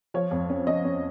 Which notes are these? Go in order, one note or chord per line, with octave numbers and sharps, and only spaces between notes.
F3 C#5
F2
C#4
C#4 D#5
C#4